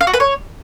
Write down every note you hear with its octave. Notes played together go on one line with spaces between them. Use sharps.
F5
F#4
B4
C#5